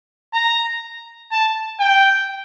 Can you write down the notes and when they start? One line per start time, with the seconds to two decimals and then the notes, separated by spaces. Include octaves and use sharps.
0.34 A#5
1.31 A5
1.80 G5